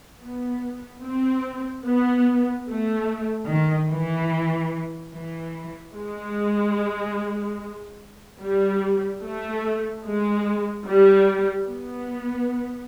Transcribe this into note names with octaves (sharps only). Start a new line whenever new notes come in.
B3
C4
B3
A3
D#3
E3
E3
G#3
G3
A3
G#3
G3
B3